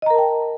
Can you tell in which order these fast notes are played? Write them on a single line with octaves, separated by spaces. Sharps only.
D#5 A#5 A#4 A5 G5